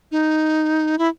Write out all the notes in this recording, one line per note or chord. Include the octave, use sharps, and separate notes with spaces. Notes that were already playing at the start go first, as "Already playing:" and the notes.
D#4
E4